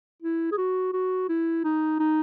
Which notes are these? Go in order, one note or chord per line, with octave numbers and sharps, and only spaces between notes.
E4
G#4
F#4
F#4
E4
D#4
D#4